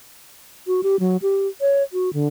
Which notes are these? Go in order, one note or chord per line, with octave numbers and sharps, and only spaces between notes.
F#4
G4
F#3
G4
C#5
F#4
D3